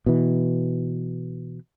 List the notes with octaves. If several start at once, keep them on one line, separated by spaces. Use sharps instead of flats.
B2 E3